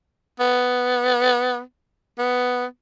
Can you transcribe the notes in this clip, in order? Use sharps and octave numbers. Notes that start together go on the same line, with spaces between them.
B3
B3